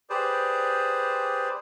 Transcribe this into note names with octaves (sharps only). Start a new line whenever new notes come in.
G4 G#4 B4 C5 D5